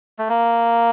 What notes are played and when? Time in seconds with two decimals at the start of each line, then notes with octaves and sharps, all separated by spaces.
0.19 A3
0.29 A#3